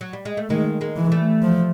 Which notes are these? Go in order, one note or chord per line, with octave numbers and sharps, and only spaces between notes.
F#3
G3
G#3
A3
D#3 G#3 A#3
G#3 A#3
E3
G3 A3
F3